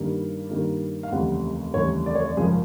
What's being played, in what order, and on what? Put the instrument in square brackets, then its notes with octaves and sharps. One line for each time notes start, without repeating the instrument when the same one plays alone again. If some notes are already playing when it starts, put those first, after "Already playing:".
Already playing: [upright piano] G2 D#3 G3 A#3
G2 D#3 G3 A#3
F5
F1 D#2 C#3 E3 G3 F#5
F1 D#2 C#3 E3 G3 C#5
D5
C#5
D5
G#1 F#2 C#3 F3 G#4